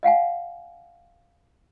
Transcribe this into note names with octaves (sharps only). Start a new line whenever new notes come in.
D#5 F5 F#5 G#5